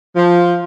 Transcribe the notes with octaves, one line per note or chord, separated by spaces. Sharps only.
F3